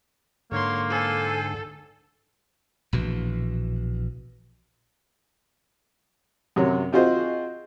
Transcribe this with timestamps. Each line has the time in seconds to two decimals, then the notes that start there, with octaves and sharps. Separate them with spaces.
0.52 G#2 D3 A#3 C#5 C6
0.90 A4 C5 G#5
2.93 A#1 B2 E3
6.56 F#2 C3 F#3 C#5
6.92 C4 F4 F#4 G#4 C5 D#5